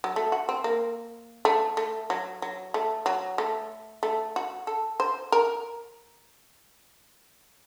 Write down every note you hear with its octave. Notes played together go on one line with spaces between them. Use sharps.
F#3
A3
F#4
C4
A#3
A3
A3
F#3
F#3
A3
F#3
A3
A3
F#4
A4
C5
A#4